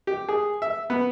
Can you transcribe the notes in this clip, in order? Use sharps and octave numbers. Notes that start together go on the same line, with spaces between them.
G4
G#4
E5
B3